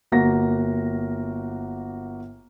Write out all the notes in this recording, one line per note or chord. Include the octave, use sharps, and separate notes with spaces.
G1 A#3 F#4 A#6